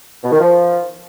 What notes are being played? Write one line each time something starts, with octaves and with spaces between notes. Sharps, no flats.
B2
D#3
F3